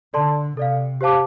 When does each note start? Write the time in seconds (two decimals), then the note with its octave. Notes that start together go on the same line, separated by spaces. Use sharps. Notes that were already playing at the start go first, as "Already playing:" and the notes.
0.14 D3 A4 D5 A5 C6
0.57 C3 A4 D5 F5
1.01 G4 C5 F5 A5 D6